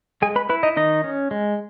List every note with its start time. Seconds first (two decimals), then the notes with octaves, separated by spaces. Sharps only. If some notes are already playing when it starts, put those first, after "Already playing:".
0.22 G#3 G#4 G#5
0.36 B4 B5
0.49 E4 B4 B5
0.63 D#4 D#5
0.76 D#3 D#4 D#5
1.04 C#4
1.31 G#3